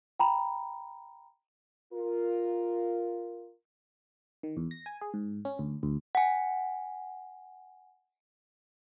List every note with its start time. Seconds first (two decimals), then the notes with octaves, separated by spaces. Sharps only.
0.19 G5 A#5 B5
1.94 F4 A#4
4.43 D#3
4.57 E2
4.71 A#6
4.86 G#5
5.01 G#4
5.14 G#2
5.45 C#4
5.59 D2
5.83 D2
6.15 F#5 G#5